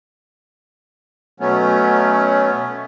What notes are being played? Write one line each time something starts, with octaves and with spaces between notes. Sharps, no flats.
B2 F#3 A3 B3 C#4